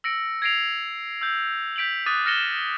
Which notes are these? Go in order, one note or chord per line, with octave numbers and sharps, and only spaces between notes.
E6 A#6 C#7 D7
G#6 A#6 C7 D7 F7
E6 G6
G6 B6 D7 F7 F#7
D6 D#6 F#6 A6 D#7
F6 A6 A#6 C#7 E7 G7